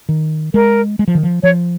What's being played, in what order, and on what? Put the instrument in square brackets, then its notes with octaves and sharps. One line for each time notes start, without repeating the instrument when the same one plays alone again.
[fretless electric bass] D#3
[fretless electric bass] G#3 [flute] A#4
[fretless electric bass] G#3
F3
D#3
F3
[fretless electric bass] F3 [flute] C#5